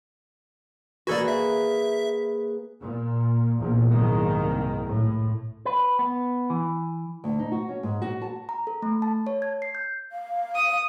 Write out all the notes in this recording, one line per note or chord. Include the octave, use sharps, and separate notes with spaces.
A#3 F#4 G#4 A4 B4 D5
E5
A#2
A#1 E2 A#2
F#1 C2 G#2 D#3 G#3
A2
B4
B3
E3
D2
D#4
F#4
C#4
G#2
F#4
A5
A#5
A4
A3
A5
C#5
G#6
C7
G6
F5
D#6